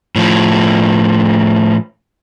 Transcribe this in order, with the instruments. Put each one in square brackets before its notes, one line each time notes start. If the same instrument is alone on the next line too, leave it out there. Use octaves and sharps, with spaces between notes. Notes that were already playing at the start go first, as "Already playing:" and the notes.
[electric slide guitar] A2 F3